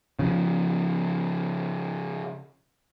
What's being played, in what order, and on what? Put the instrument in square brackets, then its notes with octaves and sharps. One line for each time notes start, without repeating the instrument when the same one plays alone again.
[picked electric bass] C#3 F3